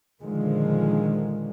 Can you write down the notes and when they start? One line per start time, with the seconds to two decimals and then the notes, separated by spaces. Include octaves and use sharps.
0.20 A#2 D3 D#3 F3 G#3